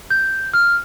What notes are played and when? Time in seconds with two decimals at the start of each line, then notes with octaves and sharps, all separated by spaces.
0.10 G6
0.53 F6